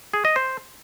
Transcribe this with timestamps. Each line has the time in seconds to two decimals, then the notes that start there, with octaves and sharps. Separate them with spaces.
0.14 G#4
0.25 D#5
0.36 C5